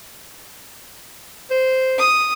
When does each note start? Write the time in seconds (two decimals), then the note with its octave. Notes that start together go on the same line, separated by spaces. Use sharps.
1.50 C5
1.98 D#6